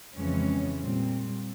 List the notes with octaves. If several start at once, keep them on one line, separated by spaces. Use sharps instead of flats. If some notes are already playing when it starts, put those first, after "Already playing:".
F2 C#3 E3 G#3 C#4
A#2 G3 C4